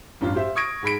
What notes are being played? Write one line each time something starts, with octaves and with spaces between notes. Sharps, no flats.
A1 G2 F4
F4 G4 C5 E5
C#6 D#6 G#6 A#6 D7
G#2 G#3 B5 B6 D7